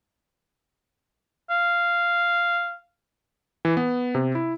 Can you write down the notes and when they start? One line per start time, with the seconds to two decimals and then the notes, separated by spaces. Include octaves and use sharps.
1.50 F5
3.65 E3
3.77 B3
4.15 C3
4.35 E4